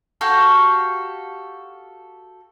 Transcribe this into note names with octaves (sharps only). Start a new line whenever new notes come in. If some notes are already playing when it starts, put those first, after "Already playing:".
F#4 G4 A4 F5